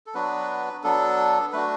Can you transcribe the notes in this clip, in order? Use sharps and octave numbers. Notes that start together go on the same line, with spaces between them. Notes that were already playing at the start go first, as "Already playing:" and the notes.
A4
F#3 B3 D4 F#4 B4
F#3 B3 D4 A4
A3 D4 F#4 B4